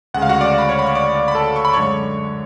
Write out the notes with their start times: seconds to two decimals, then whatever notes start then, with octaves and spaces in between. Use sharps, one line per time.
0.14 D2 C#3 G#3 F#5
0.22 F5
0.29 F#4 F#5
0.41 D5 D6
0.58 B5
0.69 C#5 C#6
0.79 B5
0.86 C#6
0.95 D5 D6
1.15 D5 D6
1.28 B5
1.35 A4 A5
1.56 C#6
1.65 B5
1.73 F#2 D3 G#3 C#5 C#6